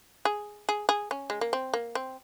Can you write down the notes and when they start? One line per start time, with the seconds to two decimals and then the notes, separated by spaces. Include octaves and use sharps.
0.25 G#4
0.69 G#4
0.89 G#4
1.11 C#4
1.30 G#3
1.41 A#3
1.53 C4
1.74 A#3
1.95 C4